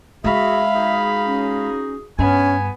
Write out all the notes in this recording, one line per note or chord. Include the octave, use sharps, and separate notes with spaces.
G#3 F#4 G#4 E5 F5 B5
D#4 F#4 G#4
C#4
G2 B3 C#4 G#5